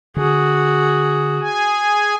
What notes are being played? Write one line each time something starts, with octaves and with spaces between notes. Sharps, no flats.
D3 F#4 G#4
G#4 G#5